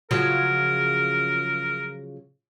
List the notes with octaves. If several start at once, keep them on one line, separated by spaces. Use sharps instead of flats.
C#3 F3 F#3 A#4